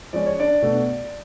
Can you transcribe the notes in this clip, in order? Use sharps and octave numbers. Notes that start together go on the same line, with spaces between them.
F3 G#3 C#4 D5
C#5
D4 D5
B2 A3 D4